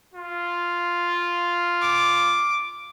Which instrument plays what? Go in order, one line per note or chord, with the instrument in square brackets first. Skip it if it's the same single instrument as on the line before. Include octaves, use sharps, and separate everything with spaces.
[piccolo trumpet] F4
[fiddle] D6